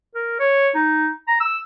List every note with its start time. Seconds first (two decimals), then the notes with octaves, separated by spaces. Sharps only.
0.15 A#4
0.40 C#5
0.75 D#4
1.28 A#5
1.40 E6